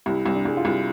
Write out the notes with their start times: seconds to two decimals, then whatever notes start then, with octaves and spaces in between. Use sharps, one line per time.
0.06 C2 E4
0.26 C2
0.35 D4
0.45 C2 G#4
0.57 F4
0.65 C2 E4